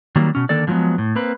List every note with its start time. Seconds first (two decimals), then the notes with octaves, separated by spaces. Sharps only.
0.16 D#3 F#3 G3 A#3
0.35 B2 C#4
0.49 D3 D#3 A#3 A4 D5
0.67 D3 F3 F#3 G#3 B3
0.98 A2
1.16 A#3 C4 B4